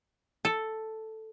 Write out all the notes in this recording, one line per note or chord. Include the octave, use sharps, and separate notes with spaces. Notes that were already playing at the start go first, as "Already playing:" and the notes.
A4